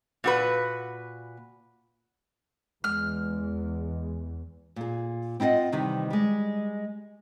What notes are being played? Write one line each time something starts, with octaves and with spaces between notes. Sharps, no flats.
A#2 F#4 B4
E2 G#3 F6
A#2 G#4
C4 E4 F4 D#5 F#5
C3 D#3 E3 G3
G3 G#3